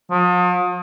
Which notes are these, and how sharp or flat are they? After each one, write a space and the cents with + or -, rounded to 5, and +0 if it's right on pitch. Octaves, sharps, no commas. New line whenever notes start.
F3 +40